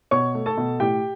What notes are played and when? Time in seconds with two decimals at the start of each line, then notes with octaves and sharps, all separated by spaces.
0.11 B2 C#5 C#6
0.35 A3
0.46 A4 A5
0.57 B2
0.80 A2 G4 G5